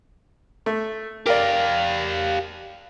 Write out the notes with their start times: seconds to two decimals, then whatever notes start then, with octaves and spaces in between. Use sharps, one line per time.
0.66 A3
1.26 G4 A#4 D5 F5